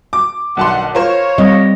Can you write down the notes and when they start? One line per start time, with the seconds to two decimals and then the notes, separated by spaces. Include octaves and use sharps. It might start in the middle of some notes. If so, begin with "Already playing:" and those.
0.13 D6
0.57 B1 G2 D#3 F#5 A5 C6
0.95 F4 A#4 C5 C#5
1.38 G3 C4 D#5